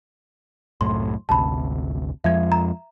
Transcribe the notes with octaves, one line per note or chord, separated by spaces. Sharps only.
C2 F#2 A2 C6
G#1 D2 C3 A5 B5
F2 F3 G#3 E5 G#6
A#5